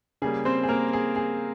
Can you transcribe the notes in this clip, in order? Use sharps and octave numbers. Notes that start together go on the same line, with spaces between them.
C#3 G3 A#3 G#4
C4 C5
G#4
A#3 A#4
G#4
G#4